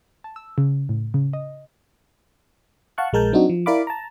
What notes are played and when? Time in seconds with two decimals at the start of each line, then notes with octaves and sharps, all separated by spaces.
0.24 A5
0.36 E6
0.58 C#3
0.89 A2
1.14 C#3
1.33 D#5
2.98 F5 F#5 A5 C#6 F#6
3.13 A#1 G#3 A#4 A5 G6
3.33 F#3 C4 D4 D#4 F#4
3.49 F3
3.66 E4 A#4 D5 F5 B5 D6
3.87 A5 A#5